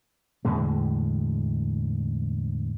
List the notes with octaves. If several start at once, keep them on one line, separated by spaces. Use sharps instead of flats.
E2 A2 D3 G#3